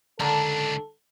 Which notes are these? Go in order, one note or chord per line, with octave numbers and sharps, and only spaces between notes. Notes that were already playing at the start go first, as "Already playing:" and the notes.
C#2 D3 D4 A4 A#4 A5